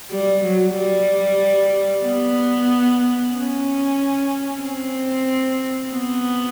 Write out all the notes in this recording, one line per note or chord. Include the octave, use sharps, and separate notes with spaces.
G3
F#3
G3
B3
C#4
C4
B3